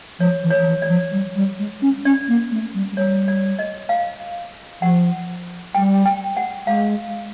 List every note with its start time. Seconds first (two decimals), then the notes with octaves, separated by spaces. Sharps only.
0.19 F3 C#5
0.43 E3
0.50 C#5
0.62 F3
0.66 E3
0.82 D5
0.89 F3
1.12 G3
1.36 G3
1.59 G#3
1.82 C#4
2.05 C#4 D5
2.28 A#3
2.51 A3
2.74 G3
2.92 G#3
2.97 G3 C#5
3.28 D5
3.59 D#5
3.89 F5
4.82 F3 F#5
5.75 G3 G5
6.06 G5
6.37 F#5
6.67 G#3 F5